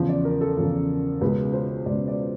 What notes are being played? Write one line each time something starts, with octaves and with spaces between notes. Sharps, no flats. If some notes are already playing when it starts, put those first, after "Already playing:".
Already playing: E2 C#3 F3
D5
A#4
A4
E2 C#3 F3
C#2 B2 G#3 B4
C5
C#2 B2 G#3 D5
D5